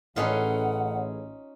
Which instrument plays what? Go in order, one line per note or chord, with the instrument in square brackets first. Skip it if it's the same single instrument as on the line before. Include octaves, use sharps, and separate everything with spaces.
[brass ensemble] A1 [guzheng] C#4 D#4 F4 [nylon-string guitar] G#4 A4 B4 [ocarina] F#5